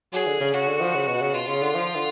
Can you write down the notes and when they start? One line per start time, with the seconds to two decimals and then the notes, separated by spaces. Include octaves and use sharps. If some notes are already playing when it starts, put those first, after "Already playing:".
0.13 F#3 G#4
0.26 D3
0.40 C#3
0.54 C#3 F#4
0.68 D3
0.80 F3
0.94 C#3
1.08 B2
1.22 C#3
1.34 B2 F4
1.48 C#3
1.62 D3
1.75 F3
1.95 D3